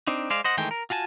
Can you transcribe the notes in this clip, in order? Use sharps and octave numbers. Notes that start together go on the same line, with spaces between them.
C4 D4 D#4
G#3 C5 D5 F5
C5 D#5 F#5
D#3 E3 G#3 A3 G5
A#4
F4 F#4 G#5 A5